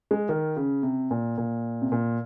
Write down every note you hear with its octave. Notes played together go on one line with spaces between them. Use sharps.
G#3
D#3
C#3
C3
A#2
A#2
C3
A#2